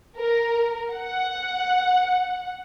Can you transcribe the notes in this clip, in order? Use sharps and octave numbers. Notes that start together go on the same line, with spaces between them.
A#4
F#5